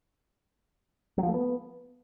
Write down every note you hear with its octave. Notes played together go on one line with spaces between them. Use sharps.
F#3
F3
A3
B3